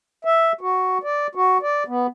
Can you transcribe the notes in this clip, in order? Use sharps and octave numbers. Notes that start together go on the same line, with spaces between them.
E5
F#4
D5
F#4
D5
B3